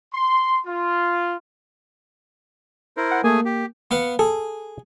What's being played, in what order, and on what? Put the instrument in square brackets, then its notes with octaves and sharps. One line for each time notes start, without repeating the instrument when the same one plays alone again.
[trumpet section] C6
F4
[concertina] E4 A#4 C5
[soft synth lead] F#5
[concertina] A3 G#4 G#5 [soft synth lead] A#3
[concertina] G4
[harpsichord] B3 F5 F#5
[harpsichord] G#4 [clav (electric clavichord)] A4